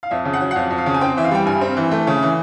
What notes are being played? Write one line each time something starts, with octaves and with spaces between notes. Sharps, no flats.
F5
F2 E5
C#3
F#5
F#3
F#5
F2 F5
F2
F5
C#3
G#5
C4 G5
E3 E5
F5
G3 G5
G2 G#5
C4
E3
A3
C#3
E3